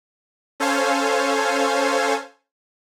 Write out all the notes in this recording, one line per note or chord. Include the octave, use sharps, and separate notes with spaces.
C#4 A4 C5 C#5 F5 G#5